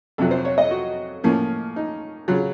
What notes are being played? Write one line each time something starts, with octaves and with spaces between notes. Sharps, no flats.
F2 C3 F#3 A4
C5
C#5
D#5
F#4
A2 F3 A#3 C#4
D#4
C#3 F#3 F4